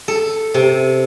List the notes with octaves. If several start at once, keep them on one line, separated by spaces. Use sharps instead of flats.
A4
C3